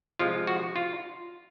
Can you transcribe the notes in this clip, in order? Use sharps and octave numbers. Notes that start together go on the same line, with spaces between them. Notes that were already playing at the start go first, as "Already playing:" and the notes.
C3 F3 G#3 F4
F#4
F4